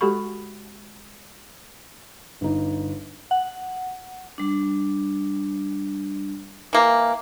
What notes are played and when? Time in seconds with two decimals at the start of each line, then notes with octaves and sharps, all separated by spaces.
0.01 G#3 F#4 G4 A4 B5 C#6
2.41 G1 D#4
3.31 F#5
4.38 G3 D4
6.73 E3 A#3